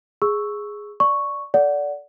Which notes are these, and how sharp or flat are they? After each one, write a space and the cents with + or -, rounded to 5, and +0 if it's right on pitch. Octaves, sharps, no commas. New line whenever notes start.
G#4 +0 C#6 +0 E6 +0
D5 +0 C#6 +0
A4 +0 D5 -20 F#5 +0